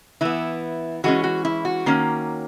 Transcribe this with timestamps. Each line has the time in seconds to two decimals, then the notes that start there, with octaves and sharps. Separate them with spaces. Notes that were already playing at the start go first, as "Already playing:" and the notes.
0.21 E3 B3 E4
1.04 E3 G#3 C#4 F#4
1.24 F#4
1.45 E4
1.65 F#4
1.86 D#3 A#3 C#4